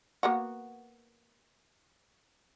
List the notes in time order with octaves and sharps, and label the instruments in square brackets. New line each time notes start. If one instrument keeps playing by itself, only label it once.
[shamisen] A#3 B3 F#4